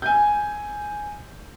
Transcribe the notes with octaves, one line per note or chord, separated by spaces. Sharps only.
G#5 G6